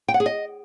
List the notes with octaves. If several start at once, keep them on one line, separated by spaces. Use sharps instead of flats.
G5
F#5
G#4
D#5